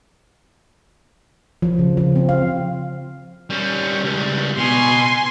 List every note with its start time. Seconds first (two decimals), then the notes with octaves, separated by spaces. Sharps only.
1.62 F3
1.79 C#3
1.97 F3
2.16 C4
2.29 F5
3.50 G3 C#4
4.04 C#2 G3
4.57 B2 G#5 C6